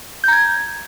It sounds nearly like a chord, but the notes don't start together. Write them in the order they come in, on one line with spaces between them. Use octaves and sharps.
G6 A#5 G#6